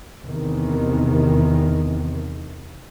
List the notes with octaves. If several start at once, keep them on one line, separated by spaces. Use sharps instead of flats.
E2 C3 D#3